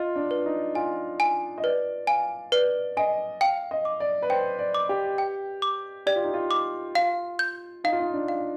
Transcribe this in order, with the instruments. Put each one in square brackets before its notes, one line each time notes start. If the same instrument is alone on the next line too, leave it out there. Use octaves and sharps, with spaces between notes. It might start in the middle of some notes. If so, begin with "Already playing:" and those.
Already playing: [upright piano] F4 [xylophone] D#5
[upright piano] D4
[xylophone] B4
[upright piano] D#4
[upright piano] F4 [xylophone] G#5
[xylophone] G#5
[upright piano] D#5
[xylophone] B4 [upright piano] D5
[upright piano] F5 [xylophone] G#5
[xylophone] B4 [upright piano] D5
[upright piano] D#5 [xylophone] G#5
[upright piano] F5 [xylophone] G5
[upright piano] D#5
[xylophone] D6
[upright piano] D5
B4
[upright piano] C5 [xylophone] G5
[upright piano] D5
[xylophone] D6
[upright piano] G4
[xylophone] G5
D6
[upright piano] G4 [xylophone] D5
[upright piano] F4
D#4
F4
[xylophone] D6
[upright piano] F4 [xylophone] F5
[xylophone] G6
[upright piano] D#4 [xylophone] F5
[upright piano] F4
D#4
D4
[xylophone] F5